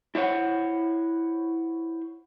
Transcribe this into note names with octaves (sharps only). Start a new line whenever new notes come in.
E4 C5 C#5 F#5